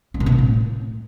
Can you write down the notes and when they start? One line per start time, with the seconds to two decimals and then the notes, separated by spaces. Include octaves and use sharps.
0.14 C#4
0.20 C3
0.26 C#4
0.32 C4
0.38 A2